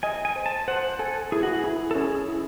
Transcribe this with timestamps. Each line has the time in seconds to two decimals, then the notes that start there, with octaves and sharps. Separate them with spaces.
0.03 D#5 G#5
0.25 G#5
0.36 C5
0.46 A5
0.68 C5 F#5
0.99 A4 G#5
1.32 E4 G#4
1.43 F#4
1.55 G#4
1.64 E4
1.91 A4
1.95 C#4 G#4
2.28 E4